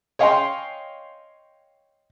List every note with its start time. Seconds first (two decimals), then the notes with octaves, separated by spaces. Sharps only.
0.19 C#5 D#5 F5 G5 G#5 C6